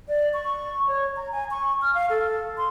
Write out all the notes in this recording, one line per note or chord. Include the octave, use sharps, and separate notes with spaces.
D5
C#6
C#5
A#5
G#5
C#6
F6
F5
A4
C6